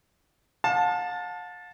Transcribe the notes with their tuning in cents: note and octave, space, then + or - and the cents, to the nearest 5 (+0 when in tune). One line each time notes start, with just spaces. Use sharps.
F5 +45 A5 +0